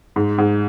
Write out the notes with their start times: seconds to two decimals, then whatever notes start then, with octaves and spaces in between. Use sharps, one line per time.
0.16 G#2
0.38 G#2